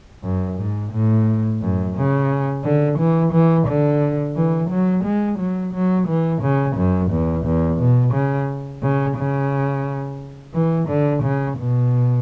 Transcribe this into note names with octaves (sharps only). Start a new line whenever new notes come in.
F#2
G#2
A2
F#2
C#3
D3
E3
E3
D3
E3
F#3
G#3
F#3
F#3
E3
C#3
F#2
E2
E2
B2
C#3
C#3
C#3
E3
D3
C#3
B2